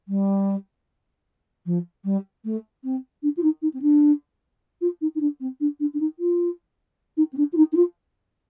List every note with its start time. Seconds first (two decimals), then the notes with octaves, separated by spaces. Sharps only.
0.08 G3
1.66 F3
2.05 G3
2.44 A3
2.84 C4
3.23 D4
3.37 F4
3.43 D#4
3.62 D#4
3.74 C4
3.82 D4
4.81 F4
5.01 D#4
5.15 D#4
5.21 D4
5.40 C4
5.60 D4
5.80 D4
5.94 D4
6.00 D#4
6.19 F4
7.17 D#4
7.33 C4
7.37 D4
7.53 F4
7.57 D#4
7.72 D#4
7.76 F4